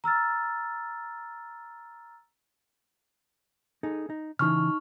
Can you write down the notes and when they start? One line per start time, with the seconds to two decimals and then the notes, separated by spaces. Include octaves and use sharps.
0.04 A#5 E6 F6 A6
3.83 D#4 G#4 A4
4.10 D#4
4.39 C#3 E3 D#4 C#6 F6